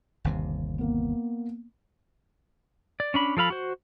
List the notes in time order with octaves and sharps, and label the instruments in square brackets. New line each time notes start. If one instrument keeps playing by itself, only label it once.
[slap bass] G1 D#2 C3
[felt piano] A#3 B3
[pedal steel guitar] D5
C#4 D4 B5
F3 A4 F5 B5
F#4 C5